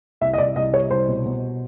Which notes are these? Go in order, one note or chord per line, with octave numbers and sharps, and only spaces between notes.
C2 E5
D#5
C2 D5
C2 D#5
G3 C#5
C2 C5
B2
B2